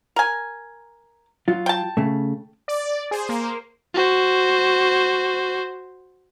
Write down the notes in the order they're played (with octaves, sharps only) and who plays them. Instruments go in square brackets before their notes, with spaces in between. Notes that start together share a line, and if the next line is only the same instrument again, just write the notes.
[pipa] A#4 G#5
[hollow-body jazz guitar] F#3 F4
[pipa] G5 A5
[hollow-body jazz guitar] C#3 A3
[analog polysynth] D5
G#4 C5
A#3 C5
[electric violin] F#4 C5